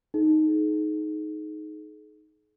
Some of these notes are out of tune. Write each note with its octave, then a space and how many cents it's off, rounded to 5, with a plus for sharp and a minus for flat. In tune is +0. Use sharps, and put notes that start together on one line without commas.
D#4 +0 G#4 +40